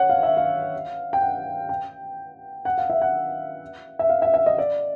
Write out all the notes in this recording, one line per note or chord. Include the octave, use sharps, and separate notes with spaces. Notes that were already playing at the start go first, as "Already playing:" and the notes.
Already playing: C#5 F#5
F5
E5
F5
G5
F#5
G5
F#5
F5
E5
F#5
E5
F5
E5
E5
D#5
D5